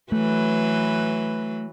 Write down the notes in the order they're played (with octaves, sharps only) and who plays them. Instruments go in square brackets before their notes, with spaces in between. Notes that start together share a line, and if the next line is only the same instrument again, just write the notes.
[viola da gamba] E3 F#3 B4 [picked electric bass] A3